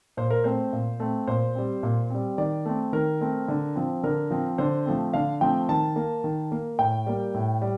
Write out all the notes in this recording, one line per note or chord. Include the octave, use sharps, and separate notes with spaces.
A#2 C5
A#4
A3 C4 C5
A#2
A3 C4
A#2 C5
G3 C4
A#2
G3 C4
D#3 D5
A3 C4
D#3 A#4
A3 C4
D3
F3 C4
D3 A#4
F3 C4
D3 C5
F3 A3 C4
D3 F5
F3 A3 C4 G5
D#3 A5
A#3
D#3
A#3
A2 G5
G3 A#3
A2
G3